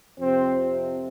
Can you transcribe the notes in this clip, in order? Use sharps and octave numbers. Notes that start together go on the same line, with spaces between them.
F2 C3 C4